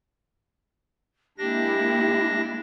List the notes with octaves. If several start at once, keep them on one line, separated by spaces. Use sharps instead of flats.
G#3 A#3 D4 E4 G4 A#6